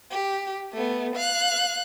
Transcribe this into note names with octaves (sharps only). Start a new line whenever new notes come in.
G4
A3 B3
F5 F#6